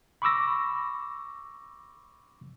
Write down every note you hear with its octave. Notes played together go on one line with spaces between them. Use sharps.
B5 C#6 D6 E6 A#6